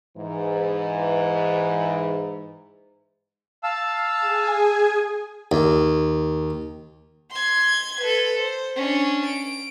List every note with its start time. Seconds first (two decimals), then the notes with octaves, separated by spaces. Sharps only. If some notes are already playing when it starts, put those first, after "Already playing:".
0.18 G#2 E3
3.63 F5 A5 E6
4.19 G#4 G#5
5.52 D#2
7.32 C6 G#6
8.00 A4 B4
8.39 C5
8.76 C#4 D4
9.27 D7